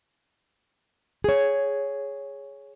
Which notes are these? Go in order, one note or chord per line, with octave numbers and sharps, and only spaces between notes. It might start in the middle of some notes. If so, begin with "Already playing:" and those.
G#4 C#5